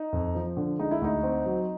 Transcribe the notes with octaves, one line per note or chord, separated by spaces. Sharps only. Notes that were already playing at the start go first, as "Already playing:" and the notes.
Already playing: D#4
F2
F3
D3
G#3 D#4
E4
D2 D#4
C4
F#3